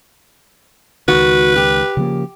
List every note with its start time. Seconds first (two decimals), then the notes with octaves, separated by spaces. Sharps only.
1.08 C#2 D#3 F#4 B4
1.56 G4
1.97 C#3 F3 A#3